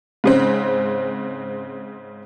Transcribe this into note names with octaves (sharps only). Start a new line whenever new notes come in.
G#2 C#3 C4